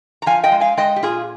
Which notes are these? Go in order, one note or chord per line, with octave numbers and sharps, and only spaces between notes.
A#5
F3 F5 G#5
D#5 G5
G#3
F5 G#5
G#3 D#5 G5
G4
A#2 F4 G#4